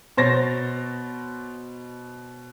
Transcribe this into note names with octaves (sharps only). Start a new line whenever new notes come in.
B2 C5 C#5 A6 A#6